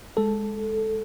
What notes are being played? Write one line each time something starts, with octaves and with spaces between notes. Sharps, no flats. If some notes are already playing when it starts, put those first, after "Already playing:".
G#3 A4